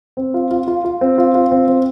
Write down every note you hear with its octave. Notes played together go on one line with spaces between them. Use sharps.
C4
F4
F4
F4
F4
C4
F4
F4
C4
C4